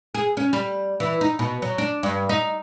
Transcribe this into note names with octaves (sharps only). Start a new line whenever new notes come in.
G#4
C#4
G3
E3
D#4
B2
F#3
D4
G2
D#4